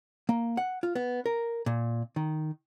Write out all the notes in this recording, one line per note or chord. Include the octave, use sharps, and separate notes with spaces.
A#3
F#5
F4
B3
A#4
A#2
D#3